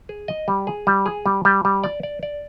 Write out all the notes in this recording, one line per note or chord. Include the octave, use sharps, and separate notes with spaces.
G#4
D#5
G3
G#4
G3
G#4
G3
G3
G3
D5
D5
D5